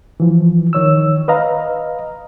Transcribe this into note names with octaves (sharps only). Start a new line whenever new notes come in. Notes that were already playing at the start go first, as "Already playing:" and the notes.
E3 F3
D#3 C#5 E6
B4 D#5 F5 A#5